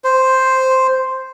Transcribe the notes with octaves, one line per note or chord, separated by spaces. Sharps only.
C5